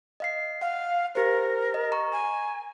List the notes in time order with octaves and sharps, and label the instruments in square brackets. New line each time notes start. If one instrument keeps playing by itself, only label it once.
[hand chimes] D#5 F5 C7
[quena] F5 [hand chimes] F#5
[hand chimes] G4 C5 [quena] A#4
[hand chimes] D#5
A#5 C#6
[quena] G#5